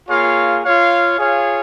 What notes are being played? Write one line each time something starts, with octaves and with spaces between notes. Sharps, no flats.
A#3 F4 G#4 C#5 F5
F4 C#5 F5
F4 G#4 C#5 F5